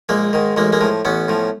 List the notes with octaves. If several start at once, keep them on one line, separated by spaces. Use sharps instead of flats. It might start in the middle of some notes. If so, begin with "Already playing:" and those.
A#1 G#3 A#3
G#2 D#3
A1 G#3 A#3
G#3 A#3
A2 F3
A1 B3 C#4
A2 F3